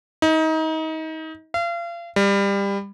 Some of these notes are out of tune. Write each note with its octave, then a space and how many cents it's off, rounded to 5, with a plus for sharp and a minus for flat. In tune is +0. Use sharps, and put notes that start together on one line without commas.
D#4 +30
F5 -35
G3 +25